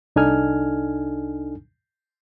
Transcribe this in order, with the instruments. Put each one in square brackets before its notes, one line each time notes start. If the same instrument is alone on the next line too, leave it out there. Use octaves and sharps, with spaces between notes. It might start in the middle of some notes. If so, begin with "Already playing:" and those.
[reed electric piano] C2 D4 D#4 A4 G#5 F6